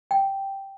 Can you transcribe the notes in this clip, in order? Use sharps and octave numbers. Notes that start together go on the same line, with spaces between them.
G5